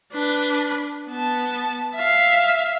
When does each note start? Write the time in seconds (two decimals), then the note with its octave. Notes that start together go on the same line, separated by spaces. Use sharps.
0.13 D4 B4
1.09 B3 A5
1.95 E5 F5